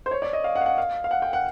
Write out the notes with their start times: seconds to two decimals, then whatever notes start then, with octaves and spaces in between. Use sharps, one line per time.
0.06 C5
0.11 C#5
0.22 D5
0.33 D#5
0.44 F5
0.55 F#5
0.61 F5
0.66 F#5
0.78 F5
1.04 F5
1.11 F#5
1.22 G5
1.33 F#5